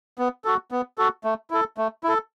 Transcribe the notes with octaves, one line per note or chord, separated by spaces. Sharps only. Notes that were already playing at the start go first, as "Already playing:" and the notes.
B3
F#4 A4
B3
F#4 A4
A3
E4 A4
A3
E4 A4